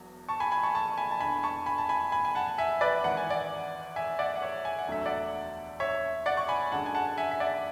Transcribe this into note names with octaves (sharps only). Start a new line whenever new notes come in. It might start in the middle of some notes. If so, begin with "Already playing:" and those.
Already playing: E1 E2 F#3
A5 C#6
G#5 B5
G#5 B5
A5 C#6
A5 C#6
G#5 B5
A5
E1 E2 D3 G#5 B5
A5 C#6
G#5 B5
A5
G#5 B5
G#5 B5
G#5
F#5 A5
E5 G#5
B4 D5
G#1 G#2 E3 F#5
G#5
D5 F#5
E5 G#5
D5 F#5
F#5
C#5 E5
G#5
F#5
E1 D2 D3 F#3 A3 E5
D5 F#5
C#5 E5
D5 F#5
C#6
G#5 B5
F#2 D3 G#3 F#5 A5
G#5
F#5 A5
E5 G#5
E5
D5 F#5